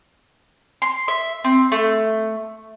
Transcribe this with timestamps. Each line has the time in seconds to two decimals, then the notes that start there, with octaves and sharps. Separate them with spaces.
0.82 C6
1.08 E5
1.44 C4
1.72 A3